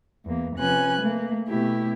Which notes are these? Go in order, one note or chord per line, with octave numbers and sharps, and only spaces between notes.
E2 A#3
C3 F3 C#4 B4 G#5 F#6
A3 A#3
B2 A3 E4 G4